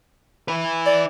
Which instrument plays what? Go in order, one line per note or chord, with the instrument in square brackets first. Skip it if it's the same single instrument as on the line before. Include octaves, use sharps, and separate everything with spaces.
[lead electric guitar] E4 B4
[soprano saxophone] D5